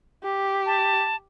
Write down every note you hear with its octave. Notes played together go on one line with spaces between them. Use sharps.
G4
A5